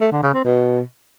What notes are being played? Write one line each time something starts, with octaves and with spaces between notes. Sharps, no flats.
A3
D3
C#3
C4
B2